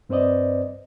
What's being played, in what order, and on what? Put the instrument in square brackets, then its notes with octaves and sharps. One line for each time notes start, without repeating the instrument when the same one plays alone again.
[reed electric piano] G2 C4 B4 C5 D5 D#5